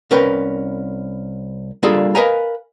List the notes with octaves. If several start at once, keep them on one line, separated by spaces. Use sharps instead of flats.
C2 C#4 A#4 B4 G5
G3 A#3 D4 F4 G#4 A4
A#4 B4 D#5 F5 G#5 A#5